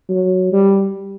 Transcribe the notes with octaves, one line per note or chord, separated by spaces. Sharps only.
F#3
G3